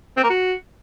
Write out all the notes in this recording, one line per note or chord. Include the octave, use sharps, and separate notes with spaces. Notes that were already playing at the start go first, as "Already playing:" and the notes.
C4
A#3
F#4